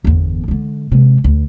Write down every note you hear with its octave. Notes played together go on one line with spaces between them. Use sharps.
G1 E2
D3 G#3
C3 G#3
D2